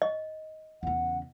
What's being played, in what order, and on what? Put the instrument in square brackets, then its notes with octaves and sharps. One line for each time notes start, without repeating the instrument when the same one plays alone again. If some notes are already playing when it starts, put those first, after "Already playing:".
[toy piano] D#5
[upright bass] E2 C#3 [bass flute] F#5